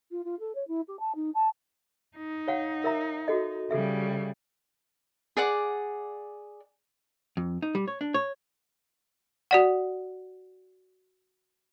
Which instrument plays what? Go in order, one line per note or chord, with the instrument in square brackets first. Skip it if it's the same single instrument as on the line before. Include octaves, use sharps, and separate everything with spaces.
[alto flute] F4
F4
A4
C#5
E4
G4
A5
D#4
A5
[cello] D#4
[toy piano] C#5 F5 F#5
A#4 E5 A#5
F#4 A4 D#5
[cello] C#3 G3 [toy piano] A4 E5
[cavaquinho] G#4 D5 F#5 D6
[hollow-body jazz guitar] F2
D#4
G3
C#5
D4
C#5
[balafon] F#4 D5 F#5